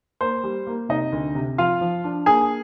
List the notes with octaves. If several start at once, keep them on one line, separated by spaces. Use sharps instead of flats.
A#3 C5
G3
A#3
C3 D#4 D#5
D2
C3
F3 F4 F5
F3
D4
A#3 G#4 G#5